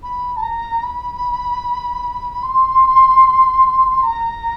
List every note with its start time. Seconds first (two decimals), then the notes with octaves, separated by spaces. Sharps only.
0.03 B5
0.37 A5
0.42 A#5
0.83 B5
2.43 C6
4.03 A#5